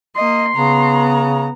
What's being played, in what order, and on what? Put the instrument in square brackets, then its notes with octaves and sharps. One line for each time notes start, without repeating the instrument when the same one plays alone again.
[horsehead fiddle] A#3 D#5 [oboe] C6
[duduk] C#3 [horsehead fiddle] B3 A#5